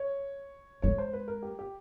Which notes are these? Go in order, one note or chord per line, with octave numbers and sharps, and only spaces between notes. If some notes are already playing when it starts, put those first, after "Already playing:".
Already playing: C#5
G#3 C#5
C5
B4
A#4
G4
G4